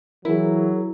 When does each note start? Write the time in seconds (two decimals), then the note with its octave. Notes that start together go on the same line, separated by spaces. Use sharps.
0.25 E3 F#3 E4 G#4 A#4